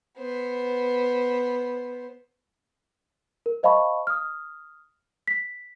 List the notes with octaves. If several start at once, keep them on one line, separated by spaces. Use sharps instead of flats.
B3 C5
A#4
C5 D#5 F5 A5 B5 C#6
D#6 F6
B6